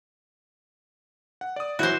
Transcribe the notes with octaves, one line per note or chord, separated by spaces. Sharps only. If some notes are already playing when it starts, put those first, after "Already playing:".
F#5
D5 D#6
E3 F#3 E4 F#4 C5